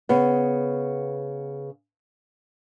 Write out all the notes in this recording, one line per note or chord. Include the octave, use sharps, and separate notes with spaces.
C#3 B3